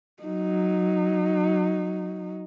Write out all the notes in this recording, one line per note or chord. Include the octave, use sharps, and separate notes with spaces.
F#3 D#4